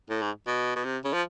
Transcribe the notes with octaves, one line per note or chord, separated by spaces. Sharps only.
A2
G#2
B2
B2
C3
C#3
F3